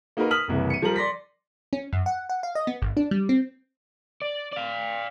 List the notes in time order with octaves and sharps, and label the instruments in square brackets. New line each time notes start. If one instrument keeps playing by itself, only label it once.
[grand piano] A#3 D#4 F#4 A#4 B4
D#6 F6 B6 F#7
F#1 C2 E3
C#7 D#7
F3 G3 A#4 A#5 F#7
D5 C6 A#6 B6
[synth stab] C#4
F#2
F#5
F#5
F5
D#5
B3
G#1
D4
G3
C4
[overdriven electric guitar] D5
D5 F5